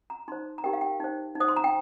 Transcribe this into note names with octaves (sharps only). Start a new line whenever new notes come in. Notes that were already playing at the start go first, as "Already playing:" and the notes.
A#5
D#4 C5 C6
A#5
D#4 G4 A#4 G5
F5
G5
D#4 C5
D#4
C5 D#6
C6
A#5
G5